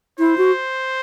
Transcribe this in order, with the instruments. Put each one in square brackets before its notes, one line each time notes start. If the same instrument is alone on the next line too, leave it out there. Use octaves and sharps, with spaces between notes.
[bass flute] E4 [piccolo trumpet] C5
[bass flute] F#4